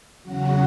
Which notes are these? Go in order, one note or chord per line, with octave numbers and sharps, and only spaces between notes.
E2 C#3 F#3 F#4